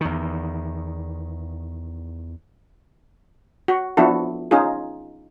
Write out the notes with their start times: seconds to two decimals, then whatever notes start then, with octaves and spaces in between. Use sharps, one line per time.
0.01 E2 D#3
3.68 F#4
3.97 F3 B3 D4 E4 F#4 A4
4.51 C#4 D#4 F4 G#4